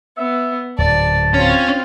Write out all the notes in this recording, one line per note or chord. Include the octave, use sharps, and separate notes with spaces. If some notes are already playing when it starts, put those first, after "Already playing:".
B3 E5
D1 G#2 D5 A5
C4 C#4 F4 C#5